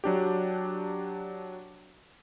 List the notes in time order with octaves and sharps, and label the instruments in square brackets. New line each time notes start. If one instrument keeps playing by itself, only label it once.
[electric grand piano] F#3 D4 G4